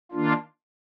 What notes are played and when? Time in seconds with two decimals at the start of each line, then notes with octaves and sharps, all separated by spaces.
0.12 D#3 A#3 D4 F4